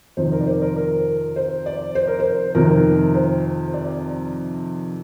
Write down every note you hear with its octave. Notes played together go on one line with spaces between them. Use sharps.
F2 C3 D#3 C5
A#4
D5
C5
A#4
A#4
C5
D5
C5
A#4
C5
F2 C3 D#3 A#4
C5
D5